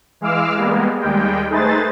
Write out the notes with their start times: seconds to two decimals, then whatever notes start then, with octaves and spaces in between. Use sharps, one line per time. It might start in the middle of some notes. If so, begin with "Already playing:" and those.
0.21 E3 G#3 F5 D6 E6 F6
0.57 G3 G#3 A#3 B3
1.00 D#2 G3 G#3 G5
1.50 A3 D#4 G#4 B4 C5 A6